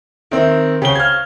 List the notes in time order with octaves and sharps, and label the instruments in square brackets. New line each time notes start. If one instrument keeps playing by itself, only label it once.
[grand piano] D#3 C4 [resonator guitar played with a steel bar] E4 E5
[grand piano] C#3 G7 [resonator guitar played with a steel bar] F#4 C5 G5
[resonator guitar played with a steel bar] C5 F5 [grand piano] F6 G#6